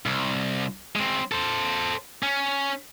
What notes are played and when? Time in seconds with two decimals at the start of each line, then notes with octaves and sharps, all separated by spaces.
0.06 C2
0.96 G#3 C4
1.32 A4 C5
2.23 C#4